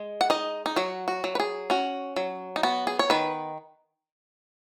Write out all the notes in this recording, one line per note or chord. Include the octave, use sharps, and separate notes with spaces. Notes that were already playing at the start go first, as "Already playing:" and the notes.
Already playing: G#3
F#5
D#4 D#5
D#4
F#3 F#4
F#4
F#3
B4
G#4
C#4 F#4
F#3
D#4
B3 F#4
G#4
C#5
D#3 B4